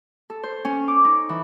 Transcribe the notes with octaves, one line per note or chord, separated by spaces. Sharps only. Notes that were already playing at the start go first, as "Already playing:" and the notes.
A4
C5
C#4
D6
D#4
E3